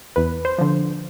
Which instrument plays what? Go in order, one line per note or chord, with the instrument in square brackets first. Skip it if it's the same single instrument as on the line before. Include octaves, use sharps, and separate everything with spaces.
[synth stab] E2 B4
C5
D3 F3